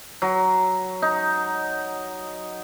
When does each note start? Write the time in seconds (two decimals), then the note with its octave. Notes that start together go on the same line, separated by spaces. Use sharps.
0.22 F#3
1.02 D#4